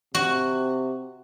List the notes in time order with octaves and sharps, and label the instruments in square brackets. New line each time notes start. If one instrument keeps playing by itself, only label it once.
[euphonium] C3 [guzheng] F#4